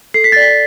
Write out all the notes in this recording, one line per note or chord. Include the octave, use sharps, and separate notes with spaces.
A4 C7
B6
A6
D5
B6